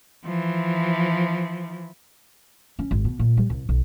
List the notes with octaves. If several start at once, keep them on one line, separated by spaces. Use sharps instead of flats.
E3 F3
C#4
G#1
B2
A#2
G3
C2
B1